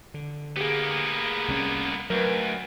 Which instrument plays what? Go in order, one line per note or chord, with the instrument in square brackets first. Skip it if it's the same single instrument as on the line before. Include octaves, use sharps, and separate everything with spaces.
[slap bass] D3
[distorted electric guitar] A#3 B3 [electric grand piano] G4 G#4
[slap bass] C2 G3 C#4
[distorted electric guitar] D2 [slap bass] F#3 [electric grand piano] A#4 B4